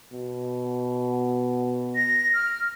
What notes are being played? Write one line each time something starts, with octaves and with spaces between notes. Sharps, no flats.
B2
A#6
F6